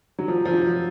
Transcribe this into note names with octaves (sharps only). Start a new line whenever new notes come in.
F#3
F3
F3
F#3